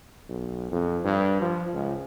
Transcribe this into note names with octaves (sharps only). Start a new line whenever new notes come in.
B1
F2
G2
F3
C#2